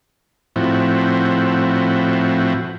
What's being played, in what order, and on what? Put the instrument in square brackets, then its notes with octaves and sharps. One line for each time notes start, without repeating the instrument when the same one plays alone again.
[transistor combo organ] A2 F3 C4 E4 F#4